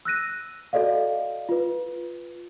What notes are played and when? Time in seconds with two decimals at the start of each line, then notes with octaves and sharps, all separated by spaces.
0.05 E6 F#6 A#6 D#7
0.73 F#4 A4 D5 D#5 F5
1.49 F4 B4